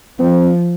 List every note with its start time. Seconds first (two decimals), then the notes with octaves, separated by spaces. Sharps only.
0.19 F3 C4